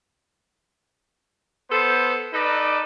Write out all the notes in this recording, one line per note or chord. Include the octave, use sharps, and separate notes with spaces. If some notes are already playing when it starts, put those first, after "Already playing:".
B3 A4 C5
D#4 A4 B4 D5